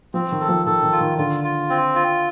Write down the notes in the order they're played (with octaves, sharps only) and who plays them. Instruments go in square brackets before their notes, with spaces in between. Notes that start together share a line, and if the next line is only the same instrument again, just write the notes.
[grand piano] F3 [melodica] C4
[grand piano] D#3
[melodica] A4
[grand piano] F3
[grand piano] D#3 [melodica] A4
[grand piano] D#3
[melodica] F4
[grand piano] D#3
[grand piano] D3 [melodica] F4
[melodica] F4
C4
F4